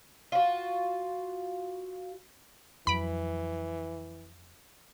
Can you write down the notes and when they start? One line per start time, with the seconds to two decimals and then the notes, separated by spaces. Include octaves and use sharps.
0.32 F4 F#4
2.87 F2 E3 F#3 B5 D7